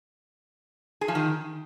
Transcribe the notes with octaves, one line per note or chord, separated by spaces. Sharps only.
G#4
F3
D#3